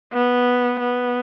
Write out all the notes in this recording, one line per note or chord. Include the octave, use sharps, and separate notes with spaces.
B3
B3